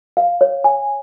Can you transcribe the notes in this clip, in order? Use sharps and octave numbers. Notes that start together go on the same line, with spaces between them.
F5
C#5
G#5